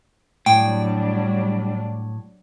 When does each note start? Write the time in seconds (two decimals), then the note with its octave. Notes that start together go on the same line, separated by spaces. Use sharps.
0.46 A2 F#3 G3 D4 G5